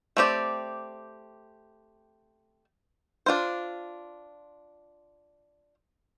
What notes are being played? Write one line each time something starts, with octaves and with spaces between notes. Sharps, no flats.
A3 C4 G4 D5
D4 F4 C5